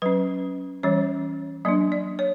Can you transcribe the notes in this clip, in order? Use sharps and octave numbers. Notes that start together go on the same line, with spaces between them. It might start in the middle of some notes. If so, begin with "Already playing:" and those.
F#3 C#4 B4
E3 G3 C#4 C#5
F#3 A#3 D4 D5
D5
C#5